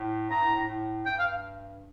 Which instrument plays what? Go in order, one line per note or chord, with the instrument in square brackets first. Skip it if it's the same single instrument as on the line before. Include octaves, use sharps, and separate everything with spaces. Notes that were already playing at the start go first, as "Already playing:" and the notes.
Already playing: [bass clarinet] A2
[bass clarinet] G2 [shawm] A#5
[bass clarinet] A2
A2
A2
[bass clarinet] G2 [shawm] G5
[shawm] F5